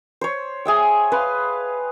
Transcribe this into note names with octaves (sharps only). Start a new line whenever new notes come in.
C5 C#5
G#4 E5 G5
B4 F5 C6